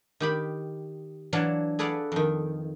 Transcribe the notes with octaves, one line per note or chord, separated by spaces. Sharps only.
D#3 G4 B5
E3 F#3 D4 F5 F#5 A5
G#4 A4 B4 D5 F5 F#5
F2 D#3